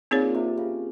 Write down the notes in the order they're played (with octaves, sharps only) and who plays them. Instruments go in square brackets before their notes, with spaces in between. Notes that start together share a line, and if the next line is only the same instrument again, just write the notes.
[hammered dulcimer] A#2 [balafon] C4 D#4 G#4 C#5
[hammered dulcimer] C3
C#3